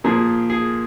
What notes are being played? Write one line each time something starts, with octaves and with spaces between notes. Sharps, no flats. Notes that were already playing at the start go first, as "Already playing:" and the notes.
A#2 F3 A#3 G#4
G#4